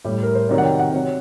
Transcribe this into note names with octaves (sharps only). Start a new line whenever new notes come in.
A2 G3 G4
A#4
C5
C3 D#3 F#3 D5
F#5
G5
F#5
C3 F#3